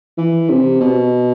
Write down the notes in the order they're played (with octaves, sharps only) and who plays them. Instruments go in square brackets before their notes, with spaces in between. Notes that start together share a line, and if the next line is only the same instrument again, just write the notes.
[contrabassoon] E3
C3
B2